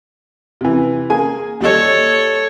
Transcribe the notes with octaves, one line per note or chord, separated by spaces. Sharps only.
C3 E3
A#3 G#4 G#5
D#2 G3 A4 C#5 D#5